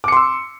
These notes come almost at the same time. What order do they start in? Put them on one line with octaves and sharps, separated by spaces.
D6 C#7 C6 E6